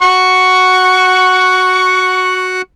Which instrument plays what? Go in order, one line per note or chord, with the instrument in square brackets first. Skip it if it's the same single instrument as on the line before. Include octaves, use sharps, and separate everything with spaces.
[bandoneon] F#4 F#5 F#6 [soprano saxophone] C#6